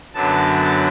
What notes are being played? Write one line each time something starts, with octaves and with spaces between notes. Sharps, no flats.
F#2 D3 F#3 B3 A5